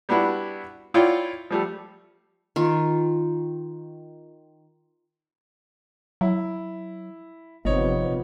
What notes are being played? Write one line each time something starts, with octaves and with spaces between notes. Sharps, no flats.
G3 B3 D4 E4 F#4
E4 F4 C#5 D5 G5
F3 G3 A3
D#3 F4
F#3 E4
G1 C3 F3 B3 D#4 C#5